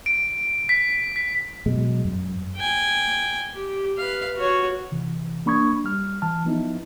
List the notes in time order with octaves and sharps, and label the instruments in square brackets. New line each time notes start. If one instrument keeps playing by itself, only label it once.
[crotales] D7
B6
B6
[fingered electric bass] B2 F#3 G#3
F#2
[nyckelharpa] G5 G#5
G4
B4 F5
F#4 C#5
[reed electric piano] C3 E3
A#3 D4 B5 C#6 D#6 G#6
G3 F6
E3 A5 F6
F3 B3 D#4 E4